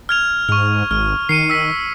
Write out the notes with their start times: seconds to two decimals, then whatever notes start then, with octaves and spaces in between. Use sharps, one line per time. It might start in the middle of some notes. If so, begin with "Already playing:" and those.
0.09 F6 G#6 F7
0.49 G#2 C#6 F6
0.91 G#1 F6
1.29 D#3 C7 C#7 D#7
1.50 E6 B6